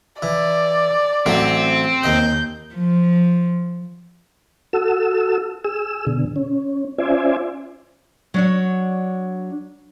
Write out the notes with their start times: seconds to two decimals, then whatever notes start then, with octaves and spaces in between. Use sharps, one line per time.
0.22 E3 D5
1.26 A1 F#3 A3 C4
2.04 D#2 D#5 G6
2.74 F3
4.73 F#4 A4 E6
5.64 G#4 E6
6.07 B2 D3
6.36 C#4
6.98 C#4 F4 C5 D5 E5 G#5
8.34 F#3 D4 C#5